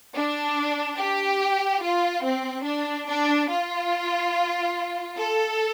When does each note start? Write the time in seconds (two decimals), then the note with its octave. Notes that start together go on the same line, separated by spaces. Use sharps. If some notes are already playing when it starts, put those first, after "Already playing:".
0.16 D4
0.98 G4
1.83 F4
2.24 C4
2.66 D4
3.09 D4
3.50 F4
5.17 A4